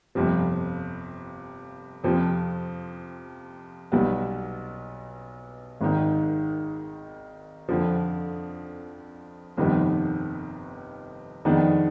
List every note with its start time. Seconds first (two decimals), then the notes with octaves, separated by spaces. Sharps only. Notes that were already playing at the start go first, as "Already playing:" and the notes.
0.15 G1 F2 C3 F3
2.03 F2 C3 F3 C4
3.92 B1 B2 G3 B3
5.81 G#1 G#2 D#3
7.69 F2 D3 F3
9.57 G1 F2 C3 D#3 B3
11.45 F2 D#3 G#3 B3 D4